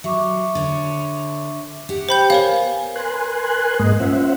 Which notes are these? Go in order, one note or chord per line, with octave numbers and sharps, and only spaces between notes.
F#3 E5 C#6 D6
D3 C#5
G4 F#5
C5 G5 B5 G6
B3 A#4 C#5 F5 G#5
A#4 B4 G#5 C6 F#6
G#2 G#3 A#3 D#5
C#4 F4 C5 E5 F#5